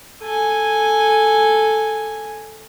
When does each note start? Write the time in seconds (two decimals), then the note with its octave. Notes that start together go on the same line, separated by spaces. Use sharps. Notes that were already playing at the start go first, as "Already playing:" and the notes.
0.22 A4 G#5